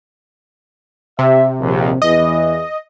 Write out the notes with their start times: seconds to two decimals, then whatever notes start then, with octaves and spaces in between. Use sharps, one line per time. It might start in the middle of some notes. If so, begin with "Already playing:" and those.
1.19 C3 E5
1.61 A#1 D#2
2.02 E2 E3 D#5